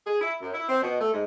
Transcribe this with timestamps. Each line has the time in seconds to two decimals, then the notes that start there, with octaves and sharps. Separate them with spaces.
0.05 G#4
0.20 E4
0.41 F#2
0.54 E4
0.68 C4
0.82 B2
0.99 A3
1.12 G#2